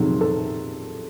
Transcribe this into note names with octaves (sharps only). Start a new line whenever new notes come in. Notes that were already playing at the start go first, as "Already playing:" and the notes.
Already playing: F2 C3 D#3 F#3 G#4
A4